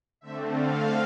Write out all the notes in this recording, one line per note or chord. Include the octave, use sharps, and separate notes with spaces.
D3 A3 C4 E5
F5